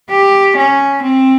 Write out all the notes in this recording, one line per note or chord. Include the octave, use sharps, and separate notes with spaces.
G4
C#4
C4